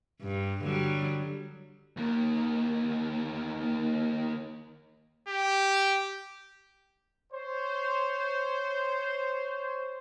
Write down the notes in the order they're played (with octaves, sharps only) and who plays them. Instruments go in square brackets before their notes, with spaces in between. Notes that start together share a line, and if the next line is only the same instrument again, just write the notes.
[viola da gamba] G2
D3 F#3 G3
[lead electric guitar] D#2 A#3
[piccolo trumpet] G4
[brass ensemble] C5 C#5